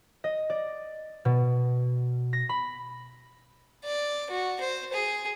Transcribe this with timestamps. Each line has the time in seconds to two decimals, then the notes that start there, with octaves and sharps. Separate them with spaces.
0.24 D#5
0.50 D5
1.25 B2
2.33 A#6
2.49 B5
3.85 D5
4.30 F#4
4.60 C5
4.93 G#4